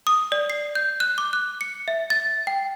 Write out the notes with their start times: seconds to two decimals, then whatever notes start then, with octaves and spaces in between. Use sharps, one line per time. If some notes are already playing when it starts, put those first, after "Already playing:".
0.07 D#6
0.32 D5
0.50 C7
0.75 G6
1.00 F#6
1.18 D6
1.33 F#6
1.61 C#7
1.88 E5
2.10 A6
2.47 G5